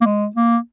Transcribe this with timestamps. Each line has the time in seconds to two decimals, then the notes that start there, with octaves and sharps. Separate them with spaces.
0.01 A#3
0.05 G#3
0.36 A#3